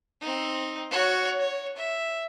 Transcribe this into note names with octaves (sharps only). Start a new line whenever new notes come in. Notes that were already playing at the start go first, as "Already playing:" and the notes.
C4 D#4
F#4 C#5
C#5
E5